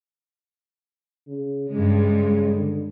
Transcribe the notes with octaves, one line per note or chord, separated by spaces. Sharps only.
C#3
G2 C#3 G#3
D3